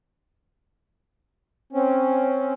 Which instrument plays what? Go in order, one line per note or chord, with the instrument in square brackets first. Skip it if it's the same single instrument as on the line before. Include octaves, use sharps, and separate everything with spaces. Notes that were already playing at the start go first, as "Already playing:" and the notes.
[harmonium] C4 C#4